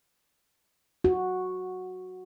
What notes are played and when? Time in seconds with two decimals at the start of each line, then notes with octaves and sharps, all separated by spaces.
1.04 F#4